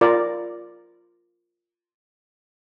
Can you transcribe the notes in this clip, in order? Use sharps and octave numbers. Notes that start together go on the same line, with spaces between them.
F4 A#4 D5